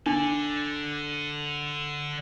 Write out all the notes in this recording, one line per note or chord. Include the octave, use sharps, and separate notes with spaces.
D3 D4 D5